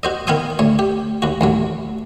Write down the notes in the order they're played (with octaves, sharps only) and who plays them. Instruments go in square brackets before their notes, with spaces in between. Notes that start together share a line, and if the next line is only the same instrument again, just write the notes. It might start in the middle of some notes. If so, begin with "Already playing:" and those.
[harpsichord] F#4 C5 D#5
D#3 B3 F5 G#5 C6 D#6
D2 C#5
G4
D#2 F#4
A1 D#2 F#3